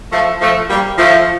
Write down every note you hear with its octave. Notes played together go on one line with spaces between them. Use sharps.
F3 A3
F3 A3
G3 A#3
F3 A3